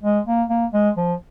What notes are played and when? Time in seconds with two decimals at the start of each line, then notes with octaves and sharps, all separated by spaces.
0.03 G#3
0.27 A#3
0.50 A#3
0.74 G#3
0.97 F3